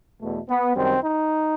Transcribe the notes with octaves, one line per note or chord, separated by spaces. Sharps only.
E2 B2 A3
B3
F#2 D#3 G3 C4
D#4